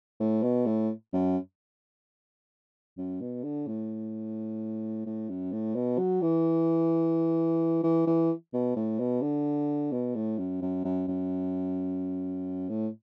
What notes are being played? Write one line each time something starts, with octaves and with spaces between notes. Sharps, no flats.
A2
B2
A2
F#2
F#2
B2
D3
A2
A2
F#2
A2
B2
F#3
E3
E3
E3
B2
A2
B2
D3
B2
A2
F#2
F#2
F#2
F#2
A2